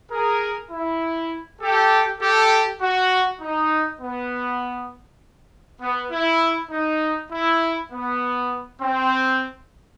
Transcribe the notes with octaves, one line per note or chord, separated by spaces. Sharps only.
G#4 A#4
E4
G4 A4
G4 A4
F#4
D#4
B3
B3
E4
D#4
E4
B3
C4